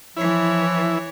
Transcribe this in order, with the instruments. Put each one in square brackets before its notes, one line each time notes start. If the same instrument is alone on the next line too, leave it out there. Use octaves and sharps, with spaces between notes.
[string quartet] E3 C#5 [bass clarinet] F3 [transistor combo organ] E4